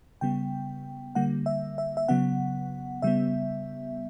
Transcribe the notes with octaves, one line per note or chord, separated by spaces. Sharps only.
C#3 G3 B3 G5
D3 G3 A#3 F#5
E5
E5
E5
C#3 F#3 B3 F#5
C#3 G3 B3 E5